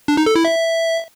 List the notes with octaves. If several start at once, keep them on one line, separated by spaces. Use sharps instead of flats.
D4
D#4
A4
E4
E5